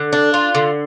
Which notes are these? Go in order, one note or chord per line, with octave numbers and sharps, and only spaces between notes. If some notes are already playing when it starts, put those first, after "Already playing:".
Already playing: D3
D4
F4
D3